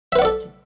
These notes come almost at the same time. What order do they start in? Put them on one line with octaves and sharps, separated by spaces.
E5 B4 F#5 D5 A4